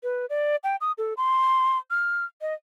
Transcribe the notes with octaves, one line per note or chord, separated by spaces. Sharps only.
B4
D5
G5
D#6
A4
C6
F6
D#5